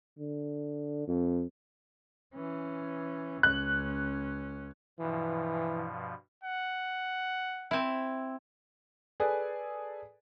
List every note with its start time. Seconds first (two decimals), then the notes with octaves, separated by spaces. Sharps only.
0.19 D3
1.08 F2
2.35 E3 C#4
3.43 C#2 C#4 F#6
4.99 G2 B2 E3 F3
6.43 F#5
7.71 C4 E4
9.20 G#4 A4 B4 D5 G#5